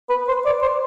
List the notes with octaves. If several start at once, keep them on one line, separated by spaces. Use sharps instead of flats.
B4
C5
D5
C5